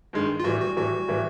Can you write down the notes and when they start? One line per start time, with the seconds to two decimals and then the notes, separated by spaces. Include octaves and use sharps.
0.13 G2 D#3 G#3
0.40 F4
0.44 A2 E3 G3 F#4
0.60 F#4
0.77 A2 E3 G3 F#4
1.08 A2 E3 G3